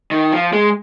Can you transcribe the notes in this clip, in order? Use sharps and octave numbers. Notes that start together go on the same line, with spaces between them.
D#3
F3
G#3